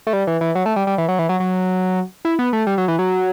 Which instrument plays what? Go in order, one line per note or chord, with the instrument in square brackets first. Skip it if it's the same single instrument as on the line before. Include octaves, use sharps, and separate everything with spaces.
[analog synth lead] A3
G3
E3
E3
F#3
A3
G3
G3
E3
F#3
E3
F#3
F#3
E4
B3
A3
G3
F#3
E3
F#3